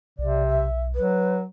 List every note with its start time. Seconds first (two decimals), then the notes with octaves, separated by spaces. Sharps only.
0.19 B1 C3 D5
0.47 E5
0.95 F#3 B4